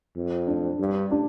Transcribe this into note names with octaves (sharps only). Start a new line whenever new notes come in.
F2
D4
G2
D4